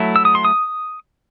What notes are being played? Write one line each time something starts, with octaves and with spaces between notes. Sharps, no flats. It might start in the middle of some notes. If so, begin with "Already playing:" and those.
Already playing: F#3 A3 E4
E6
D#6
C6
D#6